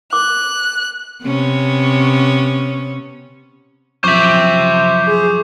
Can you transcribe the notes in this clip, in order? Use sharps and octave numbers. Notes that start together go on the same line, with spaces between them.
D6 F#6
C3 B3 C#4
F#2 F3 C5 E5 C#6 D6 G6
G#4